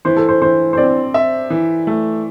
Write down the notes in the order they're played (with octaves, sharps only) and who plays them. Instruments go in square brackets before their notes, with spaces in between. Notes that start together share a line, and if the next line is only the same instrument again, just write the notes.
[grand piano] E3 [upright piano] C5
[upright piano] A4
C5
[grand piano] E3 [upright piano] C5
[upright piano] C5
[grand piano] C4 [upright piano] D5
[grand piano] E5
E3
A3